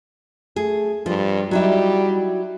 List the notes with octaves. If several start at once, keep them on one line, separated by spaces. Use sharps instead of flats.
A3 G#4
G2 F3
F#3 G3 D#4 E4